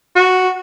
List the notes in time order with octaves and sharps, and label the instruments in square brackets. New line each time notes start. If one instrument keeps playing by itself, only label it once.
[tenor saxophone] F#4